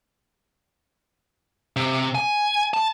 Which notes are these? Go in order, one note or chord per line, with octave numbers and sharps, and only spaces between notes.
C3
G#5
A5